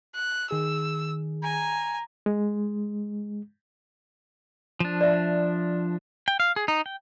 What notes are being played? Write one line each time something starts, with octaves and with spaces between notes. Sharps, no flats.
F#6
D#3 G#4 E6
G#5 A#5
G#3
F3 D4
D5 E5
G5
F5
G#4
D#4
G5